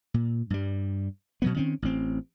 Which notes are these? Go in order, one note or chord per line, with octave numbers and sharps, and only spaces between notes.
A#2
G2 G3
B2 F#3 B3
D#3 C4 C#4
A1 C4